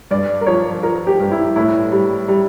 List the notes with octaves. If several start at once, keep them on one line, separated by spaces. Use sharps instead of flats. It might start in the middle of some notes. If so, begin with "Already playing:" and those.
G2 D5
A#4
F3 C#5
F3 A#4
G4
G2
E4
A2 E4
G3
G3